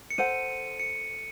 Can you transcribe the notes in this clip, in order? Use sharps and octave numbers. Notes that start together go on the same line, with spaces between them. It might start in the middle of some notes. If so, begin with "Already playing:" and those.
C#7
A4 C5 F#5 D#7
C#7